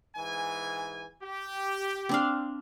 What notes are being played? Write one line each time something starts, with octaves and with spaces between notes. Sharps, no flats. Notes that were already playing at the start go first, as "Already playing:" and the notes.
G#2 E3 G#5
G4
C4 D4 F5